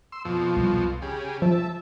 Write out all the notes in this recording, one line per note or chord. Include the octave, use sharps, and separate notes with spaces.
C6 E6
F2 B2 F3
C2
C#3 G4 G#4
F3 E5 A5